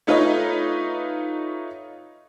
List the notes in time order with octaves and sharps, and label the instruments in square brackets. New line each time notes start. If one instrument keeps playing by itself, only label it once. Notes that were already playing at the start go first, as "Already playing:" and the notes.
[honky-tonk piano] A3 D#4 F4 B4 C#5 D#5